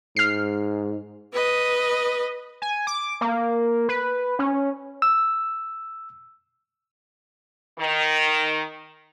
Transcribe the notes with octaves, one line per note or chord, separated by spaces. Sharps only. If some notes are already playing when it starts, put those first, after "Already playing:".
G#2 F6 C7
B4 D#5
G#5
D6
A#3
B4
C#4
E6
D#3